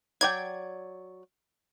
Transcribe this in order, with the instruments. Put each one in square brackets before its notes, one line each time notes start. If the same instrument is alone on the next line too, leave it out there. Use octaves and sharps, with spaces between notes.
[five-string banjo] F#3 D5 G5 [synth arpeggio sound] G#6